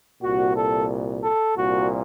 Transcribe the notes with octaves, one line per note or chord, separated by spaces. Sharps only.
C2 A#2 F#4
A4
A4
C2 A#2 F#4